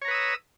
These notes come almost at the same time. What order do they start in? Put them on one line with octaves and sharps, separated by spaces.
C#5 A#5 B4 D#6 E6